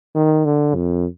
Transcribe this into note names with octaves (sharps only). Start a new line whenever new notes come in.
D#3
D3
F2